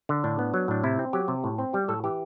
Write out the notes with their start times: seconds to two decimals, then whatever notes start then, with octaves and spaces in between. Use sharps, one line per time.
0.09 D3
0.24 A2 D4
0.39 B3
0.54 F#3
0.68 A2 D4
0.83 C3 E4
0.99 C4
1.13 F#3 G4
1.28 C3
1.44 A2
1.58 C4
1.73 G3 G4
1.88 A2 A4
2.04 E3 G4